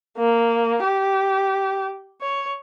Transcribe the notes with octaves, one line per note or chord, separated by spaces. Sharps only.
A#3
G4
C#5